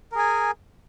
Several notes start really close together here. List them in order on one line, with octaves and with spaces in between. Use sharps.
A#4 G#4 G#5